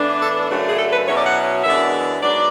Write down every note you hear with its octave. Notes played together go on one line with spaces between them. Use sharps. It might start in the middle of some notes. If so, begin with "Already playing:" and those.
Already playing: A2 E3 B3 D4
A4
F#2 C#3 F#3 A3 D4 F#4
G#4
A4
B4
B2 F#3 C#4 E4 C#5
D5
F#5
F#2 E3 G#3 B3 D4 E5
G#2 F#3 B3 D4 D5